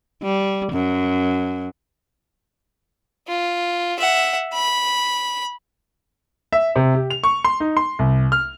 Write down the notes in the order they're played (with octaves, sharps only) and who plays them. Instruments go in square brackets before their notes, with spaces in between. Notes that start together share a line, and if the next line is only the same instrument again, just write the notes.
[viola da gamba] G3
F#2
[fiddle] F4
E5 F#5
B5
[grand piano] E5
C3
G4
F7
C#6
C6
D#4
C6
C2
F6